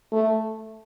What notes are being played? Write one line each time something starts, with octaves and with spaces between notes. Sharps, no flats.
A3